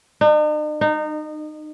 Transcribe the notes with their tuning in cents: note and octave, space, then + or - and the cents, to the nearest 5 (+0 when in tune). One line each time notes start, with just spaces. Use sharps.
D#4 -45
D#4 -25